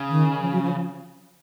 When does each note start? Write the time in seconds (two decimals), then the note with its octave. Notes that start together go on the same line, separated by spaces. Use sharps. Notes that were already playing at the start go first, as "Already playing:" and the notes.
Already playing: C#3
0.09 D#3
0.40 F3
0.51 F#3
0.62 F3